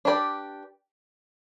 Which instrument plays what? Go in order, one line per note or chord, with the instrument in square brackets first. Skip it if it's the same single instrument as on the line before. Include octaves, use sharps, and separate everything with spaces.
[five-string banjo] D4 G4 B4 D5